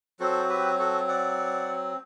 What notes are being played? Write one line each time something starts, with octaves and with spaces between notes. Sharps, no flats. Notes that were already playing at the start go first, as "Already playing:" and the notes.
F#3 C4 F#4 A4 C5
G4 B4
F#4 A4
D5 F#5